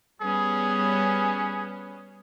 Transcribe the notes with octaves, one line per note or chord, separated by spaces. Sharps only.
G3 B3 C#4 G#4